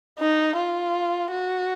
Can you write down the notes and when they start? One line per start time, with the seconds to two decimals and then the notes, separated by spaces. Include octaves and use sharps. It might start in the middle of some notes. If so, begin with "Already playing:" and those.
0.19 D#4
0.56 F4
1.31 F#4